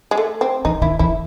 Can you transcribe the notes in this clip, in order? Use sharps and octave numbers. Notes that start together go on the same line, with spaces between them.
G#3
A3
C4
E3 D#4
D#3 E4
E3 E4